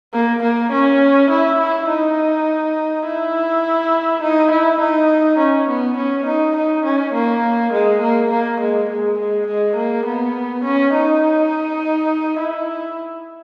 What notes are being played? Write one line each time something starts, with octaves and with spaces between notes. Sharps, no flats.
A#3
A#3
C#4
E4
E4
D#4
E4
D#4
E4
D#4
C#4
B3
C#4
D#4
D#4
C#4
A#3
G#3
A#3
A#3
G#3
G#3
G#3
G#3
A#3
B3
C#4
D#4
E4